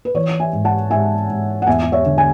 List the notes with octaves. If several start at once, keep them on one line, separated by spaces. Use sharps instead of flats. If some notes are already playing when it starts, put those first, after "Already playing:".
B4
E3 C#5
E5 G#5
G#2
F#5 A5
G#2 E5 G#5
G#2
F#5
E2 E5 G#5
C#5 E5
D3
G#5